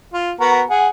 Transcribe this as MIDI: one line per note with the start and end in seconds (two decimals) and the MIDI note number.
0.14 0.32 65
0.40 0.62 59
0.40 0.62 66
0.40 0.62 70
0.70 0.88 68
0.70 0.88 78